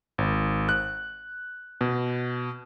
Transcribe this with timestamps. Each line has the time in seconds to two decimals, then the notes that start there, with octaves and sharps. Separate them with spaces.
0.18 G#1
0.69 F#6
1.81 B2